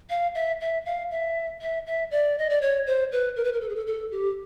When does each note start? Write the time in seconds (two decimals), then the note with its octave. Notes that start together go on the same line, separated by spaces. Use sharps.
0.10 F5
0.35 E5
0.61 E5
0.86 F5
1.11 E5
1.61 E5
1.86 E5
2.11 D5
2.38 D#5
2.50 D5
2.61 C#5
2.87 C5
3.12 B4
3.36 A#4
3.44 B4
3.53 A#4
3.61 A4
3.69 G#4
3.76 A4
3.87 A4
4.11 G4